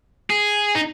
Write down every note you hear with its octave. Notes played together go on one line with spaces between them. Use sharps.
G#4
D#4